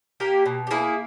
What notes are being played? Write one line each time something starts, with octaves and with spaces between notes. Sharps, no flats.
A#3 G4 A#4
B2
G4
A#3 E4 G#4